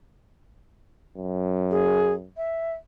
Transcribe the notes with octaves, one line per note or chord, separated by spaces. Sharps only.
F#2
G#4
E5